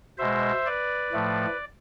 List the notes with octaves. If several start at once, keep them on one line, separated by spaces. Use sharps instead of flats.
B2 G#3 C5 E5
B4 D5
A2 F3 A3